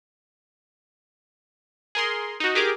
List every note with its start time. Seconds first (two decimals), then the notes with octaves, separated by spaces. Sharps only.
1.95 G#4 A#4 C6
2.40 D#4 F#4
2.55 G4 G#4 A#4 D6